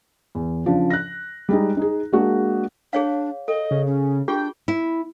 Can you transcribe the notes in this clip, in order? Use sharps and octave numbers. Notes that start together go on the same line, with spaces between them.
E2
C#3 F3 D4
F#6 A#6
G3 G#3 D#4
D#4 G#4
G#3 A#3 D4 F#4 G#4
D4 G#4 C#5 F5
A4 D#5
C#3
C#4
D4 F4 G4 G#4 G5
E4